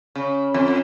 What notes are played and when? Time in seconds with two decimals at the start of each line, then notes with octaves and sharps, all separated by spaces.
0.15 C#3
0.54 F2